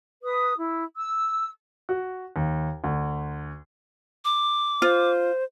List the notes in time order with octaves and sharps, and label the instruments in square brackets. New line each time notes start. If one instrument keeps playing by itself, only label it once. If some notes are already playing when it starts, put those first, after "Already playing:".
[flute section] B4 D#6
E4
E6
[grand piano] F#4
D#2
D2
[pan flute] D6
[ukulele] F4 [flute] C5